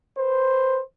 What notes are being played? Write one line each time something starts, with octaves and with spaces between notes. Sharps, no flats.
B4 C5